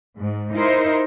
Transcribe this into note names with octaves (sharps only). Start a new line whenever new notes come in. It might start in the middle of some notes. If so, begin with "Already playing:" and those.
G#2
D#4 E4 A#4 C5